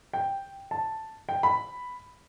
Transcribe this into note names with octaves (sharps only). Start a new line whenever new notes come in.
G5
A5
G5
B5